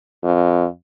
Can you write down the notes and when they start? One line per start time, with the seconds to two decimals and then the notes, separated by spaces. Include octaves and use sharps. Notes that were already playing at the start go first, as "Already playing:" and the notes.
0.24 F2